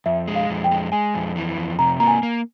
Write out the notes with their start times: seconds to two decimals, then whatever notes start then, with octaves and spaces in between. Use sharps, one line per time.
0.06 F2 E5
0.28 G#3
0.35 F5
0.50 F2
0.64 G5
0.71 G#3
0.92 G#3 G#5
1.15 F2
1.36 E3
1.57 F2
1.79 C3 A#5
2.00 A#3 A#5
2.08 G#5
2.23 A#3